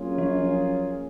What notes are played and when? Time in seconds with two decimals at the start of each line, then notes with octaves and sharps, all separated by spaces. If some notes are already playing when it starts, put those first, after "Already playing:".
Already playing: F#3 A#3 C#4 F4 G#4
0.18 F3